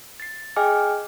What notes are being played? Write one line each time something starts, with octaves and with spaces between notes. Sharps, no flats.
A6 C7
G#4 D#5 G5 G#5 D6 F6